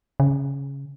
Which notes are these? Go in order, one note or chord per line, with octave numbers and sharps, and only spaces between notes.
C#3